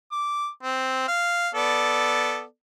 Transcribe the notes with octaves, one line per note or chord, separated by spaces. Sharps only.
D6
C4
F5
B3 A4 D5